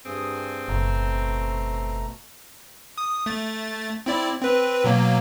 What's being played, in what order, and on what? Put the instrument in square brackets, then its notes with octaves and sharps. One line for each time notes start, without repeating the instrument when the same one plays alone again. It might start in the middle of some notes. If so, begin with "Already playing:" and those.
[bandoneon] G2 G#4 D#6 [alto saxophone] C4
[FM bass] F#1 [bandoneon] B2 A3 A#5
[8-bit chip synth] D#6
A3 A6
C4 E4 D5
C4 B4
B2 F#3 A#3